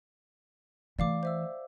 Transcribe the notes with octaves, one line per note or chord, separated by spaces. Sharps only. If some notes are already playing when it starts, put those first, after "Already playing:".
E3 A3 D5 F5 D6
C5 E5 E6